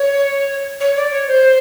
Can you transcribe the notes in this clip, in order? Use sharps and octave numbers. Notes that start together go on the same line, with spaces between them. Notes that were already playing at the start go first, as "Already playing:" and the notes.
Already playing: C#5
C#5
D5
C#5
C5